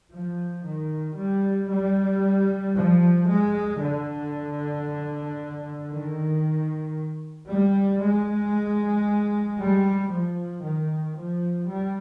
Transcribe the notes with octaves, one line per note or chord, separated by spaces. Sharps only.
F3
D#3
G3
G3
F3
G#3
D3
D#3
G3
G#3
G3
F3
D#3
F3
G3